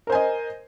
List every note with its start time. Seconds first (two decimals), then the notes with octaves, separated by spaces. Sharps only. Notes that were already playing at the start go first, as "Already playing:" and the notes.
0.07 A#4
0.10 C5
0.12 G#5
0.15 D#5